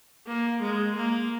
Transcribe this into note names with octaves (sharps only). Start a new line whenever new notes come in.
A#3
G#3
A#3